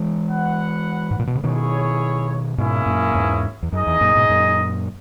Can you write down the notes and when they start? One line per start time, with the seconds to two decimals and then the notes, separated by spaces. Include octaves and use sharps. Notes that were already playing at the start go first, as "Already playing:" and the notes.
Already playing: E3 G#3
0.29 F#4 B4 F#5
1.11 G#2
1.19 A#2
1.27 B2
1.35 C#3
1.43 B2 D#3 E4 G#4 C#5
2.58 G#2 B2 A#3 C#4 E4 G#4
2.86 F#2 A#2
3.15 E2 G#2
3.63 E2
3.72 F#2 D#4 G#4 D#5
3.87 E2
4.01 F#2 A#2
4.16 G#2 B2
4.29 F#2 A#2